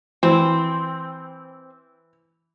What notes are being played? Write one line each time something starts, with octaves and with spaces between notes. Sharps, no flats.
E3 C4